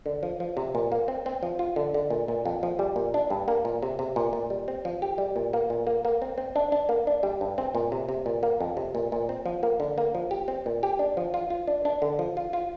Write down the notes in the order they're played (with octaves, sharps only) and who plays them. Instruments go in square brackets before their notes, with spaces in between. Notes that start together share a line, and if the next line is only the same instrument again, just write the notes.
[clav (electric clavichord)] D3
F3
F3
C3
A#2
A#3
C4
C4
F3
F4
D3
D3
A#2
A#2
F2
F3
G3
A#2
D4
G2
A#3
A#2
C3
C3
A#2
A#2
G3
C4
F3
G4
G3
A#2
A#3
A#2
A#3
A#3
C4
C4
D4
D4
A#3
D4
G3
G2
C4
A#2
C3
C3
A#2
A#3
F2
C3
A#2
A#2
C4
F3
A#3
D3
A#3
F3
G4
C4
A#2
G4
D4
F3
F4
F4
D4
D4
D3
F3
F4
F4